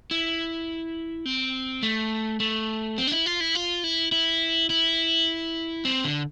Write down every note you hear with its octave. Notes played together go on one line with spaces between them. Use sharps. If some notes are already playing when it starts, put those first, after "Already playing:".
E4
C4
A3
A3
C4
D4
E4
F4
E4
F4
E4
E4
E4
C4
D3